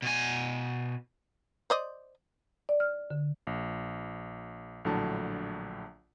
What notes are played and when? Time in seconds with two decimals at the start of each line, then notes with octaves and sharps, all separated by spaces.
0.02 B2 G#5
1.70 C5 D5 D#5
2.69 D5
2.80 F6
3.11 D3
3.47 A#1
4.85 A#1 A2 D3 F#3 A5